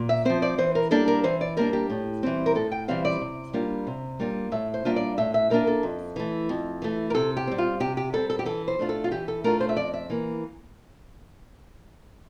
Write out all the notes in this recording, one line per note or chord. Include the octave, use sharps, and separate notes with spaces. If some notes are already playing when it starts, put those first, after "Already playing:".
Already playing: A#2
E5
F3 C4 C5
D5
E3 C5
A#4
G3 A#3 D4 A4
A#4
E3 C5
D5
G3 A#3 D4 A#4
G4
A2
E3 G3 C4
A#4
A2 A4
G5
E3 G3 C4 F5
D5
C3
G3 A#3 D4 F4
C3
G3 A#3 D4 F4
A2 E5
C5
G3 A#3 D4 F4 E5
D5
A2 E5
E5
G3 A#3 D4 F4 A#4
A4
F2
E3 A3
F2
E3 A3
A#4
C3 A4
G4
G3 C4
F4
C3 G4
G4
G3 C4 A4
A4
G4
E3 A4
C5
A3 D4 F4
A4
F4
E3 G4
A4
A3 D4 F4 A#4
C5
E5
F2 D5
E5
E3 A#3